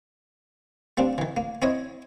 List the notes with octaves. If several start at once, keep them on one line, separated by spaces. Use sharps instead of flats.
G3 A#3 C4 D4
D#3 E3
A#3
C4 E4 C#5 D#5